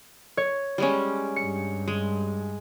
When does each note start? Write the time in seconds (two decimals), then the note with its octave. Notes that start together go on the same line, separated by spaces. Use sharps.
0.37 C#5
0.78 G3 G#3 C#4
1.36 G2 C#7
1.88 G#3